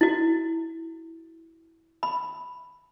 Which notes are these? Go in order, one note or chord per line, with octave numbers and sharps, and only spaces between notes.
E4 F#4
B5